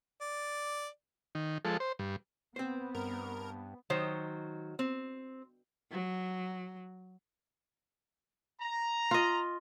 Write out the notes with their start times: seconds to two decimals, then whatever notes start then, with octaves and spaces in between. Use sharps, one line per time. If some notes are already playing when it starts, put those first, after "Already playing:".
0.21 D5
1.35 D#3
1.65 F3 G#3 A4
1.80 C5
1.99 G2
2.56 B3 C4 C5
2.95 G2 A#4
3.90 D#3 F#3 C5
4.79 C4
5.91 F#3
8.61 A#5
9.11 F4 D#5